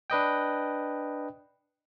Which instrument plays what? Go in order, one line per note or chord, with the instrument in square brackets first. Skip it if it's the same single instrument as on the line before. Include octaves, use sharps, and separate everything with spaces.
[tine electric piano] D4 B4 D#5 G5